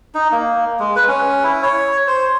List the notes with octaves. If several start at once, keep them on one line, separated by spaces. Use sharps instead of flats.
D#4
A#3
G#3
B4
C#4
E4
C#5
C5